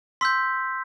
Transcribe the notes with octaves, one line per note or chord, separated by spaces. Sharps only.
C6 E6 G6 B6